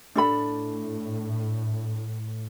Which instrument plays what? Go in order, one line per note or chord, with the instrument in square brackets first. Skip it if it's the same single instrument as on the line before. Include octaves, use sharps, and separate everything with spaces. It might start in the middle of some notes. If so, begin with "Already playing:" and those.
[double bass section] A2 [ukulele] D4 A4 B5